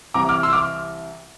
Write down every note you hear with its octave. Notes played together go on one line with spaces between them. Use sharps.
C2 C3 E3 A#5 D6
D6 F6
C6 E6
D6 F6